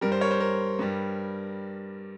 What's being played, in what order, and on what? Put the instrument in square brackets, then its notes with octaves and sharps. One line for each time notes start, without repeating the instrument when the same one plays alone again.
[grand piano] G2 G3 A#4
C5
A#4 C#5
C5
A#4
G2 G3